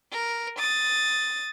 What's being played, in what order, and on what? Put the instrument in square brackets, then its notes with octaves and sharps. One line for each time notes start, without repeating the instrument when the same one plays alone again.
[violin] A#4
D#6 A6